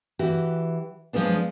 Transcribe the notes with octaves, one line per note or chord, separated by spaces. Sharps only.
E3 F#4 G4
F3 F#3 G#3 B3 D4